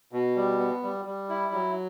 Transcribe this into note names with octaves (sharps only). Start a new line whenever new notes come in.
B2
G3
B3
G3
G3
E4
F#3